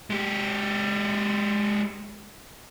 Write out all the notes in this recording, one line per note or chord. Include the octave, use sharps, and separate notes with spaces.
G#3 G4